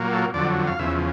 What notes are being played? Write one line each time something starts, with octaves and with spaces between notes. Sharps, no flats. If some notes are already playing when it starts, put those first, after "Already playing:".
Already playing: A#2 F#3 A#3
A4
F2 D3 F#3 D5
F5
E2 C#3 F3 E5